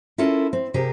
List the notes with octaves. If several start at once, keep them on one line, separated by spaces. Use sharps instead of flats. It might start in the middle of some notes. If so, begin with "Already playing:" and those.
C#4 E4 F4 A4 A#4
C4
C3 G4 G#4 A#4